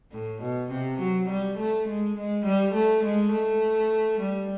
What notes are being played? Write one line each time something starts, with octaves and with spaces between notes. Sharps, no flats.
A2
B2
C3
F#3
G3
A3
G#3
G#3
G3
A3
G#3
A3
G3